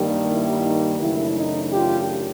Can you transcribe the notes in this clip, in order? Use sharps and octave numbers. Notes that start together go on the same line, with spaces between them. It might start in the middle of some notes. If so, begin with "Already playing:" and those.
Already playing: G2 D#3 G3 A#3
E4
D#4
F#2 C#3 E3 A3 D4 E4
D#4
F4 G4